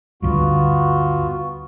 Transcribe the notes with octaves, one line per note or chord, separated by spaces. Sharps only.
D2 G2 B3 F4 F#4